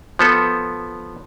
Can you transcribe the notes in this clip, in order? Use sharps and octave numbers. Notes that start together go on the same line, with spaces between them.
F3 B3 A4